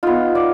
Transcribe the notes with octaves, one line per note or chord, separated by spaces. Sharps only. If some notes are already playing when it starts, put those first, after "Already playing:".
B3 D#4 F4
D5